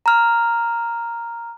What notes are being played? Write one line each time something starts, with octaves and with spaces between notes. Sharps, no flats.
A#5 F6